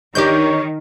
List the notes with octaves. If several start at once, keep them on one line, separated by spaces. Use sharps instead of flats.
D#3 D4 D#4 G4 A#4 C#5 G6